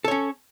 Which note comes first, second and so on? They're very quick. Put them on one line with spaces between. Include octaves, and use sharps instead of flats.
A4 C#5 C#4